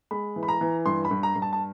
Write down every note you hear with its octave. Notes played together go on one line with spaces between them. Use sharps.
G#3 B5
E3
B5
A#5
E3
G2 C6
B5
G2
A#5
G2
A5
A5